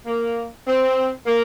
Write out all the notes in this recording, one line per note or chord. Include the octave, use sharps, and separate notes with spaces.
A#3
C4
A#3